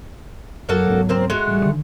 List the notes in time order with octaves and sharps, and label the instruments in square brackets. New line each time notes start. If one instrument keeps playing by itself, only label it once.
[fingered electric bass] F#2 [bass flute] F#3 [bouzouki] A#3 F#4 A4
[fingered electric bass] C#2 G#2 B3
[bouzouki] A#3 C4 C5
G#3 A3 F#4
[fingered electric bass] A1 [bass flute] G3
[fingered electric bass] D3 D#3